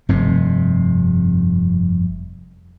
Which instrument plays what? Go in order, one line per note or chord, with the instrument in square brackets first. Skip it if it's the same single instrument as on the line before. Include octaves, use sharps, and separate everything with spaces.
[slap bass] F1 G2 C3 C4